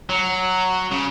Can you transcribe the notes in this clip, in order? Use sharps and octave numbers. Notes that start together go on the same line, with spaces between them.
F#3
C#3